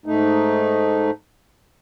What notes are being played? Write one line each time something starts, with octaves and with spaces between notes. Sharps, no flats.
G#2 A3 D#4